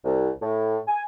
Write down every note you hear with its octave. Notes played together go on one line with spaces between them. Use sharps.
C2
A2
G#5